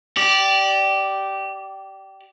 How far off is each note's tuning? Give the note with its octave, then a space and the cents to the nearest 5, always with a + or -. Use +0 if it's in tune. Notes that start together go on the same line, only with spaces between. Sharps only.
G4 -20 D5 +0